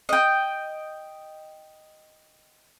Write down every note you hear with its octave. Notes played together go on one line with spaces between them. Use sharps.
D#5 G5